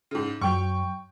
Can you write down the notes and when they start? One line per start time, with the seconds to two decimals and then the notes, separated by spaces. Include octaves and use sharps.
0.11 G#2 C#3
0.41 F#2 F#3 G5 C#6